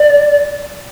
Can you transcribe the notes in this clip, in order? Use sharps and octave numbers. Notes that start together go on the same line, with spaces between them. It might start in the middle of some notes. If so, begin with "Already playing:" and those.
Already playing: D5